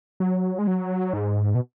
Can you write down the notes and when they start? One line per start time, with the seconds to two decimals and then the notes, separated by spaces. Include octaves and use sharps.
0.20 F#3
0.59 G#3
0.67 F#3
1.13 G#2
1.55 B2